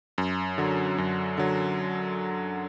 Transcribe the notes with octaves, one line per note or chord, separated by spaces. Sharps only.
F#2
D3 F#3
F#2
D3 F#3